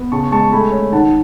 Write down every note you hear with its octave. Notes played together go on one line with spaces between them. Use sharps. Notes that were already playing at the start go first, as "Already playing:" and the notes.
Already playing: B3
C#3 A5 C#6
G#3 A5 C#6
A3 G#5 B5
C#4
D#3 F#5 A5